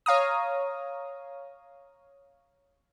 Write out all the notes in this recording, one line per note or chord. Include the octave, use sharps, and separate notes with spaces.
C#5 F5 A#5 D#6